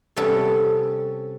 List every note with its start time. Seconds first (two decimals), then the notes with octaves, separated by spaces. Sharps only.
0.16 C3 G3 B3 C#4 A4